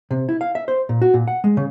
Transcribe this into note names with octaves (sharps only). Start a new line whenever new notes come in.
C3
E4
F5
E5
C5
A#2
F#4
A#2
F#5
G#3
C#3